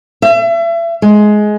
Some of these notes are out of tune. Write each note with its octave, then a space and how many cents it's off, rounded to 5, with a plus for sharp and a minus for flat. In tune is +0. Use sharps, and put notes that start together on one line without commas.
E5 +35
G#3 +15